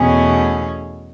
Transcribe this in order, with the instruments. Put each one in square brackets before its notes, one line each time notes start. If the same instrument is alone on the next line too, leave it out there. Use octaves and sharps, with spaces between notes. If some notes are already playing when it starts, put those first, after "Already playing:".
Already playing: [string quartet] E2 B2 A3 C#4 G#4